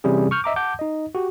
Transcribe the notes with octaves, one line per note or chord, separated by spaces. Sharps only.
C3 E3 G3 C#4 G#4
C#6 F6 G6
D#5 E5 A#5 D6
F#5 A5 D6 G6
D#4 D#5
F#4 G4